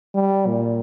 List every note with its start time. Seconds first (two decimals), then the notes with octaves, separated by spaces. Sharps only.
0.15 G3
0.46 A#2